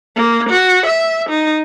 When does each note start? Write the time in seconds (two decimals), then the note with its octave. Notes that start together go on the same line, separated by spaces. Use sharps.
0.16 A#3
0.50 F#4
0.86 E5
1.29 D#4